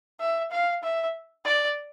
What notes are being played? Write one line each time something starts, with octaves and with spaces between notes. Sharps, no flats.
E5
F5
E5
D5